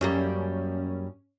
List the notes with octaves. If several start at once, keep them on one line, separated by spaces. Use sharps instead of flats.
F#2 G3 A#3 C#4